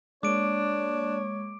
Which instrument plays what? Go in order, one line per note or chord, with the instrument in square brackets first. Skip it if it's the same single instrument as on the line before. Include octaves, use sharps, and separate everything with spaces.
[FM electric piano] G#3 A#3 [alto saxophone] D4 [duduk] C#5 [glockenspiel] D6 D7